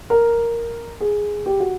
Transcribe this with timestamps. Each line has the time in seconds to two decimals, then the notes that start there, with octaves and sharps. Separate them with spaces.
0.10 A#4
1.00 G#4
1.46 G4
1.60 F#4